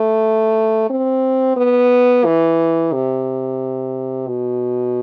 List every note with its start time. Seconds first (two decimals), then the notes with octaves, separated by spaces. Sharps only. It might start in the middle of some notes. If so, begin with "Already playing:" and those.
Already playing: A3
0.90 C4
1.56 B3
2.24 E3
2.92 C3
4.27 B2